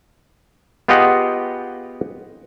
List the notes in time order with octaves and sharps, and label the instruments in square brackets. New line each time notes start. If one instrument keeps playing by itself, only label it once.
[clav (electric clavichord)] B3 F4 G4 G#4 D#5 F#5